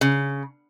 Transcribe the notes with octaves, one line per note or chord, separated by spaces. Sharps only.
C#3